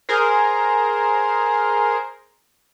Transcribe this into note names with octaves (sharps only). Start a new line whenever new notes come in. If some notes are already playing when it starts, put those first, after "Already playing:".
G#4 A#4 C5